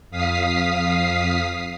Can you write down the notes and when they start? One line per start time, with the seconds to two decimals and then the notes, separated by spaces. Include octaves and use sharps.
0.11 F2 F5 D#6 B6 C7